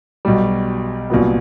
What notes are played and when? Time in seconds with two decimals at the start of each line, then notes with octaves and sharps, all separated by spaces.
0.25 B1 B2 G3
1.10 C2 A#2 F#3 B3